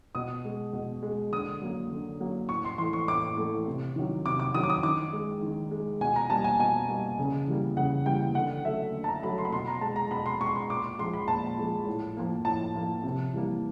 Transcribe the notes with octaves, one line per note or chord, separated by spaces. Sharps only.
B2 D#6
G#3
B2
G#3
D3 D#6
F#3 A#3
D3
F#3 A#3
A2 C#6
C6
E3 A3 C6
C#6
A2 D6
E3 A3
C3
D#3 F#3
C3 D6
D6
D#3 F#3 D#6
D6
D#6
D#3 D6
G#3
D#3
G#3
B2 G#5
A#5
G3 A#3 A5
G#5
B2 G#5
G3 A#3
C#3
E3 G3 A#3
C#3 F#5
E3 G3 A#3 G5
D3 F#5
F#3 A3 E5
D3
A5
A#5
F#3 A3 B5
C6
B5
B2 C6
A#5
G#3 A5
A#5
B2 B5
C6
G#3 C#6
C6
A#2 D6
F3 G#3 C6
B5
A#2 A5
F3 G#3
A2
F3 A#3
A2 A5
F3 A#3
C3
E3 G3 A#3